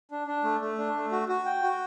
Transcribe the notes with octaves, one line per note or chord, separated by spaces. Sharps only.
D4
D4
A3
A3
D4
A3
F#4
F#4
G5
F#4